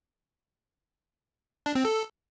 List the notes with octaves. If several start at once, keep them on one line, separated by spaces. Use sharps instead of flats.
D4
C4
A4